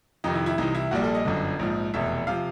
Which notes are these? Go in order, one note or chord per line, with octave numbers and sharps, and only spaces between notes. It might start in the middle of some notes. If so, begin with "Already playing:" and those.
F2 C3 D#3 D#4
E4
E4
C2 C3 E3 D#4
E4
A#1 A#2 G3 F#4
A4
D#5
G1 F#2 D3
A#1 G#2 F3
F1 E2 B2 E5
C3 F3 F5